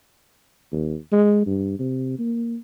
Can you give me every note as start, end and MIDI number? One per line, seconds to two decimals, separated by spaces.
0.72 0.96 39
1.12 1.45 56
1.46 1.75 43
1.79 2.16 48
2.19 2.57 58